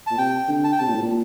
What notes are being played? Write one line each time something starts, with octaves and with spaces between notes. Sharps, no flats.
A#2 A5
C3 G5
D3
A5
G5
C3 A5
A#2
A2
A#2